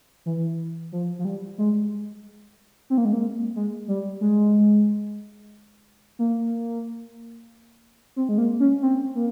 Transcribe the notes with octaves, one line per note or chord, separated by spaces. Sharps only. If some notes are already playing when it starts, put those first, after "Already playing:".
E3
F3
F3
G3
G#3
C4
A#3
G#3
A#3
G#3
G3
G#3
A#3
C4
G#3
A#3
C#4
C4
A#3